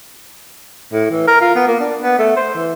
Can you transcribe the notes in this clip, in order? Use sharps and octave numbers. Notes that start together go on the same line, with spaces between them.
A2
E3
A#4
F4
B3
A#3
D4
B3
A3
C5
E3